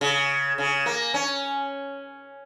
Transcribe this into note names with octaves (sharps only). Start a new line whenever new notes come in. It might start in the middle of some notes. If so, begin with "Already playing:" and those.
C#3
C#3
A#3
C#4